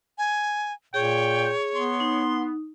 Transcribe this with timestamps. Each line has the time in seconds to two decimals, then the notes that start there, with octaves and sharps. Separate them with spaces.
0.18 G#5
0.94 A#2 G#4 C#5 G5
1.75 B3 C6
2.00 D#4